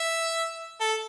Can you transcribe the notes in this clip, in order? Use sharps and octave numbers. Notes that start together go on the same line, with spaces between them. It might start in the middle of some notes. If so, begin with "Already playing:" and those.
Already playing: E5
A4